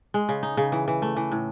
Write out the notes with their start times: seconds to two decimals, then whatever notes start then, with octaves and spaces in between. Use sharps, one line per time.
0.14 G#3
0.29 C#3
0.43 D#4
0.57 C#3
0.72 E3
0.88 E3
1.02 A3
1.16 E3
1.32 A2